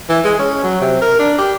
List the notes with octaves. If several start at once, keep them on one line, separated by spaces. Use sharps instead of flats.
E3
G#3
C#4
F#3
C3
A#4
D4
G4